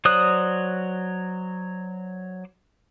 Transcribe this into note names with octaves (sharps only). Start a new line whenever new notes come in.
F#3 C5 D5 D#6 F#6